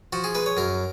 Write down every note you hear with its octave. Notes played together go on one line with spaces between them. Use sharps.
F3 F#4
G#4
G#3 B4
C#5
F#2 A#4